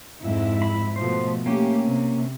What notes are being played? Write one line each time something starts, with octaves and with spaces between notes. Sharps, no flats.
F2 G#2 E4
B5
B2 F3 A3 C5
A3 A#3 C#4 G4
C3